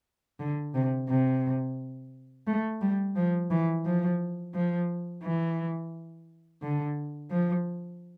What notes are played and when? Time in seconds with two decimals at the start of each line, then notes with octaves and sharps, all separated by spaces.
0.40 D3
0.74 C3
1.09 C3
2.47 A3
2.81 G3
3.16 F3
3.51 E3
3.85 F3
4.54 F3
5.23 E3
6.62 D3
7.31 F3